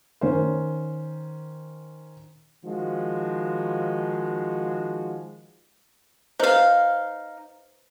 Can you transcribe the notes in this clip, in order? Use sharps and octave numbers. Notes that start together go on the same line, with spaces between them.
D#3 C#4 C5
D#3 F3 G#3 F#4
D#4 B4 C5 F5